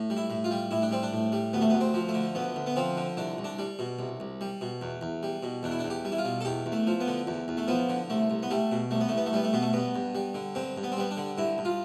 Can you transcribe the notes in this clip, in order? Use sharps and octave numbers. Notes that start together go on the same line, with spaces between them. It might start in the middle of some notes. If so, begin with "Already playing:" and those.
Already playing: A2
G3
E4
A2
F4
G3
A2 E4
D4
G3 C4
D4
A2
G3
D2 B3
A3
B3
D2
C4
F3
A3
D3
D2 B3
D2
B3
F3 C4
D3
C2 D4
C2
D4
G3
B2
C2
C2
G3
B2
E2
E2
G3
B2
E2 D4
E4
D4
E2
G4
G3
E4
F4
B2
A4
E2 G4
E2
A3
F3
B3
D3
E2
E2
A3
F3 B3
D3
C2 A3
C2
B3
G3 A3
B2
C2 A3
B3
C2 A3
B3
A3
G3 B3
A3
B2 B3
A3
G2 B3
G2
G3
D3
G2 C4
G2
B3
C4
G3 B3
D4
D3
G2 E4
G2
F4